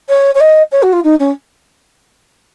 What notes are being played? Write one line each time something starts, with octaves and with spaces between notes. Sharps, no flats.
C#5
C#5
D#5
C#5
F#4
F4
D#4
C#4